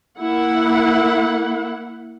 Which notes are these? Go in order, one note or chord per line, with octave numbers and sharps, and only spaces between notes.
A#3 E4 F#5